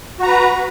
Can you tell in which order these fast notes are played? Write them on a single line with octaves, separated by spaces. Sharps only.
F#4 A#5 B4